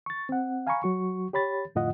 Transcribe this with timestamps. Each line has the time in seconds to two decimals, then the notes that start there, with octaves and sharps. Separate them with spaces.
0.06 C#6 A6
0.29 C4 F#5
0.67 F5 G#5 A#5 B5 C#6
0.83 F#3 F#4 C#6
1.33 G4 C#5 B5 A6
1.75 F2 A2 D3 F4 D#5 F#5